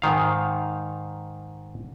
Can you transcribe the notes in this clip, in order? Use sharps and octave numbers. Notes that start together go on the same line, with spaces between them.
G#2 D#3 F5